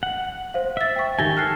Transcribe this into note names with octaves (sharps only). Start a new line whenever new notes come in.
F#5
C5 F5
E5 E6 A6
G5 C#6
D#3 G4 G#5 A6 A#6 G7
A4 F6 F#6 C7